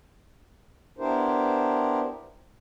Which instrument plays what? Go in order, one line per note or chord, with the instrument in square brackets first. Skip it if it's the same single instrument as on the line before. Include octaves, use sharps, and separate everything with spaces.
[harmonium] B3 D4 E4 G4 A#4 C5